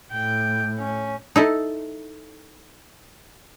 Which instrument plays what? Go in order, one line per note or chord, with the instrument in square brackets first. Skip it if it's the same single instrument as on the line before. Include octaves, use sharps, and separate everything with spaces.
[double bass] A2 [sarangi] G5
[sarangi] C#4
[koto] D#4 E4 A4